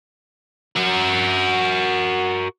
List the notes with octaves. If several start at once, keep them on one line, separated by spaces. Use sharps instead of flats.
F#4 A#4